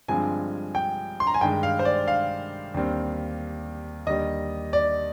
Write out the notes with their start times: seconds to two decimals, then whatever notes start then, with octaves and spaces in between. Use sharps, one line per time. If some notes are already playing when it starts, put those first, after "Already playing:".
0.08 G2 D3 F3 G#3 C4 G#5
0.75 G5
1.20 C6
1.27 A#5
1.34 G#5
1.41 G2 D#3 G#3 G5
1.63 F5
1.79 C5
1.85 D5
2.08 F5
2.74 D#2 D3 G3 C4
4.07 D#2 D3 G3 D#5
4.73 D5